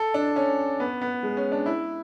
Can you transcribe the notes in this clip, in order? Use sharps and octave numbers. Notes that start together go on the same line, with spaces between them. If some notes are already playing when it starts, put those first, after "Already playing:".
Already playing: A4
D4
C#4
B3
B3
G#3
C#4
D4
E4